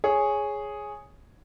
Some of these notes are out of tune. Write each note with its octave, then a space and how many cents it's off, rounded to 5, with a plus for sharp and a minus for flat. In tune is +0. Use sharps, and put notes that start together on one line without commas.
G#4 +0 C#5 +0